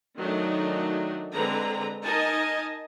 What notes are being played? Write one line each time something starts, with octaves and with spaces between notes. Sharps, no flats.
D#3 F#3 A3 D4 D#4
D3 G#3 C4 B4 A#5
D#4 A#4 D#5 G#5 A5